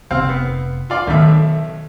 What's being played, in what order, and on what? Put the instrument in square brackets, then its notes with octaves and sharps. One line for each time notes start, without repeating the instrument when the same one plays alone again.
[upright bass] F1 [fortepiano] C4 F5 E6
[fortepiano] B3
F4 D5 F5
[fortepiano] B1 A2 E5 [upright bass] D#3 D#4